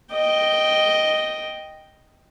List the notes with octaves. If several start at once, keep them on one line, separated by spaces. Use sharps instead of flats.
D#5 G5